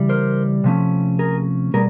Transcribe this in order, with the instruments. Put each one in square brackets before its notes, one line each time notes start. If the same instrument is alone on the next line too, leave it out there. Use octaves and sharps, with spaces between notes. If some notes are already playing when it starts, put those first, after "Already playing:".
Already playing: [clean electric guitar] C#3 E3 G3
A#4 C5
C3 F3 A3 C#4
G#4 A#4
B2 G3 G#4 A#4